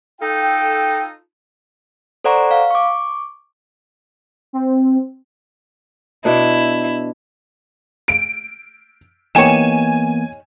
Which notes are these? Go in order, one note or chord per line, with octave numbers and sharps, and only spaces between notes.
D#4 F4 A4 G5
A4 C5 D5 F#5 A#5 C#6
F5
C#6 D6
C4
B2 D4 E4
D7
E3 A#3 B3 D#4 G4 C#5 G#5 E7